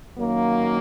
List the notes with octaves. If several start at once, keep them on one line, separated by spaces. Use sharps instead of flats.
F#2 D#3 F#3 A#3